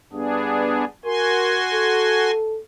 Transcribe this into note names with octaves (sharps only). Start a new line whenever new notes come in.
G2 B3 D4 G#4
F#4 A#4 G#5 C6
A4